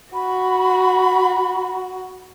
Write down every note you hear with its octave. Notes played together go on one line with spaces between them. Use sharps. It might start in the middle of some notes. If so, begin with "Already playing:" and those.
F#4 B5